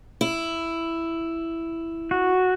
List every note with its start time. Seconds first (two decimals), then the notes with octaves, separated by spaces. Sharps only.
0.21 E4
2.11 F#4